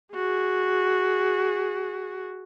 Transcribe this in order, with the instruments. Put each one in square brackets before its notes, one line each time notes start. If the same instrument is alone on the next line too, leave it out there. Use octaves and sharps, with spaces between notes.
[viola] F#4 G#4